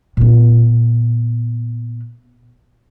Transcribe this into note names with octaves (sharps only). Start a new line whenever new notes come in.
A#2 B3